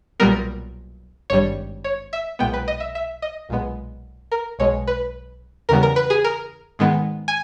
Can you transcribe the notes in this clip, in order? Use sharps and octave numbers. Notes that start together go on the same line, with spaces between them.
B1 A#2 G3 B3 A#4
G#1 G2 G3 C#5
C#5
E5
B1 A#2 G#3 B3 G5
B4
D#5
E5
E5
D#5
B1 A#2 G#3 B3
A#4
B1 B2 G#3 C#5
B4
E2 C#3 G3 B3 A#4
A#4
B4
G#4
A#4
G#2 D#3 G#3 B3
G#5